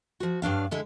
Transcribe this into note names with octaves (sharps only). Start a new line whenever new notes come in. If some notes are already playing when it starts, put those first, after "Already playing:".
F3 F#4
G2 F#3 D4 F5
D3 G#3 E4